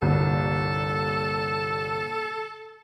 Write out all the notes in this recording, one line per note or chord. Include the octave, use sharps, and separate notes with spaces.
G1 C2 A#2 A4